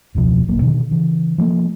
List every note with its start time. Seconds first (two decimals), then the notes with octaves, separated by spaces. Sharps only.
0.15 E1 C#2 B2 F3
0.48 E1 A1 F#3 A#3
0.61 B2 D3 D#3
0.91 C#3 E3
1.38 F3 F#3 A3 A#3